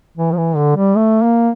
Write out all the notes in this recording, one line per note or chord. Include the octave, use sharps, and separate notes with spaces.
E3
F3
E3
D3
G3
A3
A#3